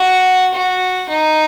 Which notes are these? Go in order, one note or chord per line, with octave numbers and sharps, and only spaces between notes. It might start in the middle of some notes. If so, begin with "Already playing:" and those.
Already playing: F#4
F#4
D#4